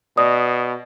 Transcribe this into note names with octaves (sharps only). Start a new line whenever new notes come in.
B2 D5 D#6